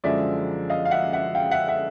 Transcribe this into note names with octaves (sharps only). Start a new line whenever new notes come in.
F#2 D3 F3 G#3 D5 E5
D#5 F5
F5
E5 F#5
E5 F#5
F5 G5
E5 F#5
E5 F#5